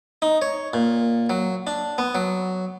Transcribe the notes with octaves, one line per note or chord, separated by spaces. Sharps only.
D#4
C#5
A#2
F#3
D4
B3
F#3